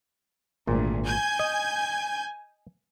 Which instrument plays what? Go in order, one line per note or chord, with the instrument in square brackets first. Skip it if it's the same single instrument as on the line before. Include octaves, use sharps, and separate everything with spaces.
[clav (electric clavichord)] G#1 A#2 [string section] D2
[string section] G#5 G6 G#6
[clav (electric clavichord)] D#5